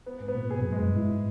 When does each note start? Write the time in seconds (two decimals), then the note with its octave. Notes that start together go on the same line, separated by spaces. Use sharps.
0.06 B3
0.21 G#2
0.28 B3
0.35 A#2
0.50 B2 G#4
0.61 F#2
0.72 F#2 G#3
0.83 G2
0.95 G#2 E4